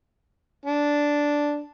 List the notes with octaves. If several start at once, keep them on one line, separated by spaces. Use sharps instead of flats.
D4